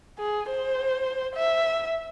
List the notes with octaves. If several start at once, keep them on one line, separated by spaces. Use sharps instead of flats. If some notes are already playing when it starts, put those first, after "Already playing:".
G#4
C5
E5